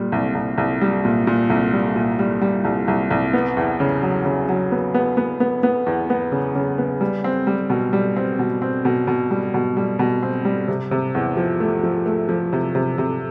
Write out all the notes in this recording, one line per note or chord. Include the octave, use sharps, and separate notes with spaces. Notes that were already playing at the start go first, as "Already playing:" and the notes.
Already playing: A#2 G3
C2
C2
C2
G3
A#2
A#2
C2
G3
A#2
G3
G3
C2
C2
C2
B3
E2
C#3
F#3
C#3
F#3
B3
B3
B3
B3
B3
E2
B3
C#3
C#3
B3
G3
C4
G3
B2
G3
C4
B2
C4
B2
B2
G3
B2
G3
B2
C4
G3
C3
C3
E2
F3
A3
F3
A3
F3
C3
C3
C3